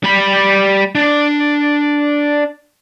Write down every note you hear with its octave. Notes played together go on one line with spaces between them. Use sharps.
G3 B5
D4